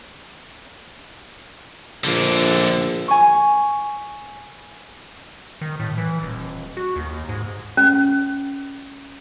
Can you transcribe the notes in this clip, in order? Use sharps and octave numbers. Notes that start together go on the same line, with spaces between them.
A#1 D3 A#3
G#5 C#6
D#3
A2
E3
D#1
F#4
D#2
G#2
C#4